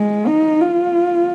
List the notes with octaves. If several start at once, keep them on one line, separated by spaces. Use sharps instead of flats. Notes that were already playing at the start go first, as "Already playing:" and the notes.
Already playing: G#3
D#4
F4